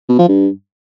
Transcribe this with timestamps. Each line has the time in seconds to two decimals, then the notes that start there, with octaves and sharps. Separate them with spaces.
0.09 B2
0.19 F3
0.28 G2